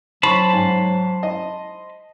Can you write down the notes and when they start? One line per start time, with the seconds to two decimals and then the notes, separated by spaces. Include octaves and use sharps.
0.23 F#3 C5 A5 B5 C#6
0.53 G#2
1.23 D#5